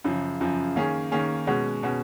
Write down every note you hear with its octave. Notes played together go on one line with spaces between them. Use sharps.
F#2 C#3 F3
F#2 C#3 F3
D#3 A#3 C#4 G#4
D#3 A#3 C#4 G#4
B2 G#3 C#4 F#4
B2 G#3 C#4 F#4